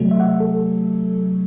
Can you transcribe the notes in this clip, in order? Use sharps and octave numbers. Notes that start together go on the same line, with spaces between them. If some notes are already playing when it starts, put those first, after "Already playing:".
Already playing: C3 F#3 A3
E5
F#5
E5
A4